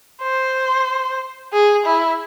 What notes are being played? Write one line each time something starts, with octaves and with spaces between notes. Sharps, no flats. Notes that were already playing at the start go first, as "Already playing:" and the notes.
C5
G#4
E4